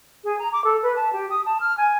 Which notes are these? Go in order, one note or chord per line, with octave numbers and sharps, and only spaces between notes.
G#4
A#5
D6
A4
B4
A5
G4
D#6
A5
F6
G#5